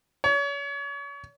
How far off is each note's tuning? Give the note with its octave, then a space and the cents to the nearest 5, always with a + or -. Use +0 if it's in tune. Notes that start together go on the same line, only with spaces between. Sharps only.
C#5 +35